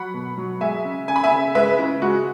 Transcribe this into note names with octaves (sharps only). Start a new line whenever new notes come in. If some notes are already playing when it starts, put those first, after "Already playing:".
Already playing: F#3 F#5 B5
B2
F#3
G#3 E5 G#5
C#3
C#3 G#5
B5
E5 G#5
C#3
G#3 B4 E5
C#3 E4
G#3 F#4